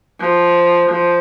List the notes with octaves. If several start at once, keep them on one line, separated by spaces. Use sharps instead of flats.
F3
F3